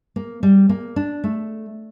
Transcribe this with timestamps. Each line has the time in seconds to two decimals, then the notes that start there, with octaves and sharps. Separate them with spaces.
0.16 A#3
0.43 G3
0.69 A#3
0.96 D4
1.24 A3